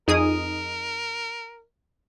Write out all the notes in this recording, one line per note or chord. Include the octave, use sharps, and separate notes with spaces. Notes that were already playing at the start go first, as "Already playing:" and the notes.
F2 D#4 G#4 A#4 D#6